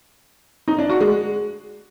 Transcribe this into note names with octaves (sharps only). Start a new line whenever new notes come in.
D#4
D4
F#4
G#3